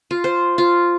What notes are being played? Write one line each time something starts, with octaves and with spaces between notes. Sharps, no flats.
F4
C5
F4